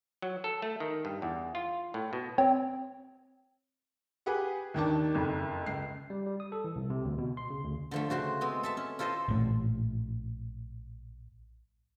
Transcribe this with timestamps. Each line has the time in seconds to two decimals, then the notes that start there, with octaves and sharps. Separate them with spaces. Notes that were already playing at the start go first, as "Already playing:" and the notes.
0.22 F#3
0.44 A4
0.62 A3
0.80 D#3
1.05 G2
1.22 E2
1.55 F4
1.94 A2
2.13 B2
2.38 C4 C#5
4.26 G4 G#4 B4 F#5
4.74 D#2 D#3 D4 A5
5.14 F#1 F2
5.66 C#2 C7
6.10 G3
6.26 G3
6.40 D#6
6.52 A4
6.64 E3
6.76 C2
6.90 C3
7.05 D2
7.18 B2
7.37 C6
7.50 C#3
7.64 D2
7.91 D3 F3 A3
8.10 C#3 F#4 C5 C6
8.41 G#3 B3 C4
8.63 A4 E5 A5
8.77 C#4
8.99 E4 F4 A4 C5 D#5
9.28 A#1 A2